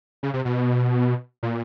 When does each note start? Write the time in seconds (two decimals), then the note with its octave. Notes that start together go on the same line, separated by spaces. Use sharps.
0.23 C#3
0.34 C3
0.45 B2
1.43 A#2